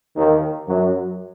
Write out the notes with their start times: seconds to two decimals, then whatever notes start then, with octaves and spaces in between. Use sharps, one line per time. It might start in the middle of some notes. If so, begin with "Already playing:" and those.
0.16 D#2 D#3
0.67 F#2 F#3